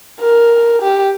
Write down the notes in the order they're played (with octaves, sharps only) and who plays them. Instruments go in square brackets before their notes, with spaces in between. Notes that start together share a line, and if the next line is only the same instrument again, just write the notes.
[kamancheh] A#4
G4